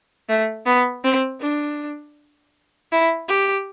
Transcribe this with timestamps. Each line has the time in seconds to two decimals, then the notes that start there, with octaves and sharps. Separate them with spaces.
0.29 A3
0.66 B3
1.04 C4
1.41 D4
2.92 E4
3.29 G4